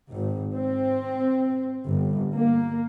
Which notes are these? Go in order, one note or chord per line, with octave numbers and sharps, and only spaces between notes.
G#1
C4
G1
A#3